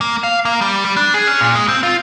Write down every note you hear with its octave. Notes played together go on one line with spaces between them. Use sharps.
A#3
F5
A#3
G3
G3
D4
G#4
C#4
A#2
G#3
C4
F4